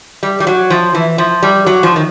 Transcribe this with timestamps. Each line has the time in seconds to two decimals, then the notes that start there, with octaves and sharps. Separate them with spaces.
0.23 G3
0.40 G3
0.47 F#3
0.70 F3
0.94 E3
1.18 F3
1.43 G3
1.66 F#3
1.83 F3
1.96 D#3